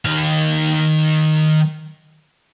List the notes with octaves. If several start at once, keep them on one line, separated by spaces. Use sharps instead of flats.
D#3 F5